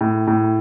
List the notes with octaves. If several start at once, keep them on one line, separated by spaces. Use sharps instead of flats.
A2
A2